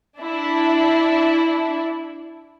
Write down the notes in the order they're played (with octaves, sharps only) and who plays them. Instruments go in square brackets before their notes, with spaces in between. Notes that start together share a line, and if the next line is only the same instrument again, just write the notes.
[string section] D4 E4